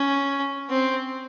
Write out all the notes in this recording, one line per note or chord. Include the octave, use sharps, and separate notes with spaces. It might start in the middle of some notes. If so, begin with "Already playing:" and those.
Already playing: C#4
C4